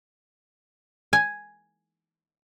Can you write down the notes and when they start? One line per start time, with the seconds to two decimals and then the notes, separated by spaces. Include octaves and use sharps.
1.13 G#5